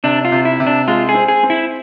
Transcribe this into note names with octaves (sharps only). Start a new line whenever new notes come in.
C3 D4
F4
C3
E4
C3
D4
G#3 F4
G#4
C4
G#4
C4
E4